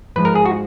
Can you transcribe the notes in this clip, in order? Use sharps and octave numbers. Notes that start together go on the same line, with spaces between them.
G#2 F3 G#3 B4
A#4
G#4
F#4